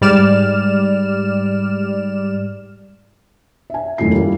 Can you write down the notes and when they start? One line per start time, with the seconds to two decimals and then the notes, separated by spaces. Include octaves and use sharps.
0.01 G#2 G3 D5 F6 E7
3.70 E5 G#5
3.98 E1 F#2 A2 D#3 F4 C7
4.15 F3 G3 A#3 E4